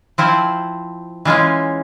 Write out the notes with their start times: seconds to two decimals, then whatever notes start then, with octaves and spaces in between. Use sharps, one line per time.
0.18 F3 C4 E4
1.25 E3 G#3 C#4 F4